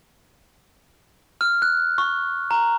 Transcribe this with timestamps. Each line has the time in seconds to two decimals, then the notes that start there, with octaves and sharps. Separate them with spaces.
1.41 F6
1.62 F#6
1.98 C#6
2.51 A#5